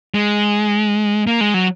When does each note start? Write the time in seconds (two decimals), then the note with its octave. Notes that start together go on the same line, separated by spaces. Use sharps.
0.14 G#3
1.27 A#3
1.41 G#3
1.54 F#3